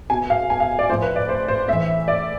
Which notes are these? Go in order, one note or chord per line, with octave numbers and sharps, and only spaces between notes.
B2 G#5
F5
G#5
F5
D5
A2 F3 C5
B4
D5
C5
C5
A2 E3 E5
D5